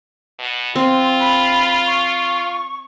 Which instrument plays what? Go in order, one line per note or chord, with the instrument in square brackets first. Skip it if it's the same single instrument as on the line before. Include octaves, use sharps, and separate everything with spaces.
[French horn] B2
[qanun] C4 [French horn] F4 [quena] C6
[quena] B5
C#6